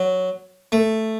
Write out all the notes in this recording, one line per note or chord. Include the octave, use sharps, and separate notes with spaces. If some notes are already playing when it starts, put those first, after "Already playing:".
Already playing: F#3
A3